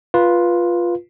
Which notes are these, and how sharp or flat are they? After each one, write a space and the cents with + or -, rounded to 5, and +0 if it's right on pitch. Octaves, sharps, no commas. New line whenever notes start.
F4 +0 B4 -15